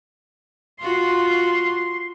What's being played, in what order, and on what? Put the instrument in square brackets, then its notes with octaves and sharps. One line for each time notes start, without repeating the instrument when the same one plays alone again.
[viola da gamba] F4 F#4 [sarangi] C6